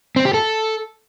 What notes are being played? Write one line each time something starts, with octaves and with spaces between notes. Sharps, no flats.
C4
G4
A4